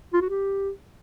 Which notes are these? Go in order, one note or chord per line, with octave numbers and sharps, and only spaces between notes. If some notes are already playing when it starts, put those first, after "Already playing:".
F4
F#4
G4